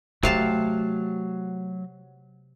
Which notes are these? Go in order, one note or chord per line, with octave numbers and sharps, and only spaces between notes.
C3 F#3 A3 F5 A5